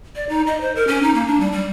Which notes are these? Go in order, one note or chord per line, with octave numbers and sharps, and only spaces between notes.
D5
D#4
D#5
C5
A#4
C#4
D#4
A#3
D4
G3
G3